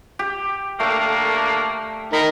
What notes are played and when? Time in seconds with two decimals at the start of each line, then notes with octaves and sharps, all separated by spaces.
0.19 G4
0.80 D3 A3 A#3
2.13 D#4 A#4 B5